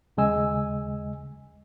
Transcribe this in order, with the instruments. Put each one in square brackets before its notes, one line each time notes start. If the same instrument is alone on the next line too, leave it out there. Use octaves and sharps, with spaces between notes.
[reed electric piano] D#2 C#3 G#3 D#5 G#5 E6